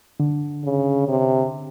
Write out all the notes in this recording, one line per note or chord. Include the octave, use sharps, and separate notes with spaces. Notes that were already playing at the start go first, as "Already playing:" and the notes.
D3
C#3
C3